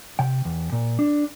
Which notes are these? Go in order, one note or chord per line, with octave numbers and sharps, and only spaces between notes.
C3 G5
E2
A#2
D4